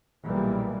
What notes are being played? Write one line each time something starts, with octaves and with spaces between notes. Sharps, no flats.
B1 A#2 E3 G3 G#3 A#3